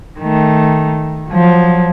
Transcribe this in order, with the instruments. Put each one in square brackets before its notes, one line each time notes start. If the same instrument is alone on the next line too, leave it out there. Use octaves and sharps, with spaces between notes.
[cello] D#3 A3
F3 F#3